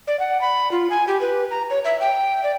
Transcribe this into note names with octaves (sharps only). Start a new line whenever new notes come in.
D5
F#5
B5
F4
G#5
G4
B4
A#5
C#5
E5
G5
D5